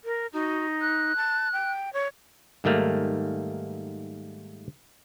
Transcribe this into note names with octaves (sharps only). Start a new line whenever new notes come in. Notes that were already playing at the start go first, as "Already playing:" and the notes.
A#4
D#4 F#4
F#6
A5
G5
C#5
G#2 D#3 G3 A3 A#3